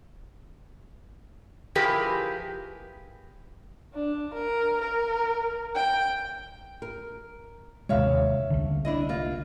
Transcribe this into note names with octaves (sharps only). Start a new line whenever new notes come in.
F3 E4 G4 G#4 A#4 B4
D4
A#4
A#4
G5
A#4
D#2 C3 G#3 C#5 E5 F5
C2 D3
D4 E4 D#5
A#3 F4